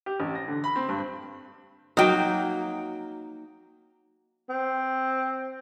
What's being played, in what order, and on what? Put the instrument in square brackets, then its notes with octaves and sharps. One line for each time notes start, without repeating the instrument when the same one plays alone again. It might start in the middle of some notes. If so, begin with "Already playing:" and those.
[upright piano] G4
A1
A#6
D3
B5
C4
G2
[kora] F#3 A#3 F#4 [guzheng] D#4 G5
[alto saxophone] C4